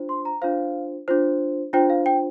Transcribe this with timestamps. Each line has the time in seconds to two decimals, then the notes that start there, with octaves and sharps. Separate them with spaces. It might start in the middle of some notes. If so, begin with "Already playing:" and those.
Already playing: D4 F4 C5
0.09 C6
0.25 A#5
0.42 D4 F4 C5 F5
1.08 D4 F4 C5
1.73 D4 F4 C5 G5
1.90 F5
2.06 G5